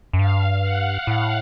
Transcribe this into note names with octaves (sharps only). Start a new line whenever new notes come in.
F#2
G2 F5
F#5
A2 F5